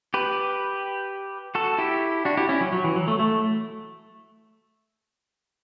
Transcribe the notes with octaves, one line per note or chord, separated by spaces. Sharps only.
G4 B4
F#4 A4
E4 G4
D4 F#4
E4 G4
C#4 E4
F#3
F#3
E3
F#3
A3
A3